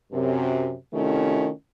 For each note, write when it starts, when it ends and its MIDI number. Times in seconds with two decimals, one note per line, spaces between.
0.12 0.74 42
0.12 0.74 48
0.94 1.49 48
0.94 1.49 51
0.94 1.49 57
0.94 1.49 61
0.94 1.49 64
0.94 1.49 65